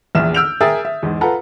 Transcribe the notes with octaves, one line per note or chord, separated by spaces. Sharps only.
A#1 E2 E5 E7
E6 F6 G6 D7 F7
G#4 A#4 E5 G5 D#6 A6
E5
E2 G#2
F4 A4 B4 F#5 A#5